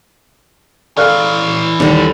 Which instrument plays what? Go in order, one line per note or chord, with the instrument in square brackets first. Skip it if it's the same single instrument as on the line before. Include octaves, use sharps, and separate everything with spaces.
[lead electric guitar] E3 C#5 [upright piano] G#4 A4 F5 [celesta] D5 F6 F#6
[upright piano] D#2 [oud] D3 G3